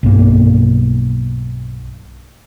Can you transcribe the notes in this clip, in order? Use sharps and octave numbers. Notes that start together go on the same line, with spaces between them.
B1 G2 A#3